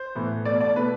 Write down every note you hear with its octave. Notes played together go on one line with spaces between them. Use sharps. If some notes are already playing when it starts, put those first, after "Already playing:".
Already playing: C5
A2 E3 B3
B2 A3 D5
D5
B2 A3 B4